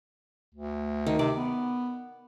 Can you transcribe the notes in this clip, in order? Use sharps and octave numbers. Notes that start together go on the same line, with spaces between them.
D2
D#3
C3 D5
B3